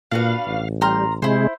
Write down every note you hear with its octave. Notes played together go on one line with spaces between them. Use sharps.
A#2 D4 F#4 B4 F5
A1
G3 A#5 C6 F6
C3 G#3 E4 C5